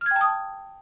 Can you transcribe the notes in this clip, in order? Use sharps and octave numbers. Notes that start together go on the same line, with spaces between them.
G5 A5 D#6 F6 G#6